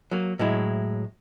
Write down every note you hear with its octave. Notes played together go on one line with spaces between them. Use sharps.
F#3 A#3
A2 F#3 G#3 E4